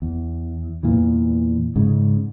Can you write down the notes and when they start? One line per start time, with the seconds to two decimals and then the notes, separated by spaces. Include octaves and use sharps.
0.02 E2
0.83 E2 A#2 E3
1.76 G#2 C#3